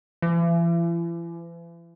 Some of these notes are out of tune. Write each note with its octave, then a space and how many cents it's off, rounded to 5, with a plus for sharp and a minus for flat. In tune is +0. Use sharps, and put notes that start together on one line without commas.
E3 +40